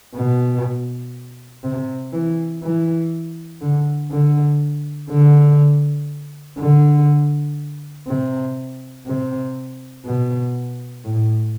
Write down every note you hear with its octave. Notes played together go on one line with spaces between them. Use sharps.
B2
C3
E3
E3
D3
D3
D3
D3
C3
C3
B2
A2